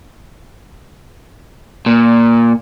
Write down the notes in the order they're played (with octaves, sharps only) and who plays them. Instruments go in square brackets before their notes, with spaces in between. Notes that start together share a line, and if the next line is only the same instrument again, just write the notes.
[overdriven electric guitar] A#2